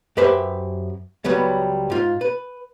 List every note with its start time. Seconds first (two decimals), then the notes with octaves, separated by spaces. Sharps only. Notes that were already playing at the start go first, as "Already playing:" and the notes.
0.17 F#2 G4 B4 C5 E5
1.24 C#2 F#3 G3 B3
1.90 G#2 F4
2.21 B4